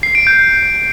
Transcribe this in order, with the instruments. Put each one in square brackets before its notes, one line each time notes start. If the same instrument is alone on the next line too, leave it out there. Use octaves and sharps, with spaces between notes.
[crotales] C7
D7
G6